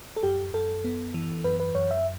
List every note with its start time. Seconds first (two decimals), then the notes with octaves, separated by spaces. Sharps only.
0.16 A4
0.23 F#2 G4
0.54 F#2 A4
0.84 B3
1.14 E3
1.44 F#2 B4
1.60 B4
1.75 F#2 C#5
1.91 E5